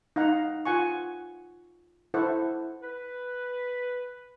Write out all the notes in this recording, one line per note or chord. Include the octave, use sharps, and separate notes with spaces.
D#4 F5 F#5 A#5
F4 F#5 G#5 C#6
E4 A4 C5 F#5 C#6
B4